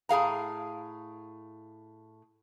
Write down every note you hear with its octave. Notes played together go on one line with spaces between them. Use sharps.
A2 G#4 F5 A#5